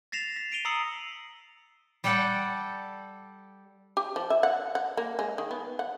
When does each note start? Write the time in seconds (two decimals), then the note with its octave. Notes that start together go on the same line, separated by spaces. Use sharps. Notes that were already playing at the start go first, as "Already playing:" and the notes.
0.12 A6 A#6 C7 E7 F7
0.36 B6
0.52 B6 D7 D#7 F7 G7
0.65 A#5 D#6 E6 C7 C#7 F#7
2.04 G3 G4 A4 F#5 G5 A5
3.97 G4
4.16 F3
4.30 E5
4.43 F#5
4.75 F#5
4.97 A#3
5.19 G#3
5.38 D#3
5.51 B3
5.79 F#5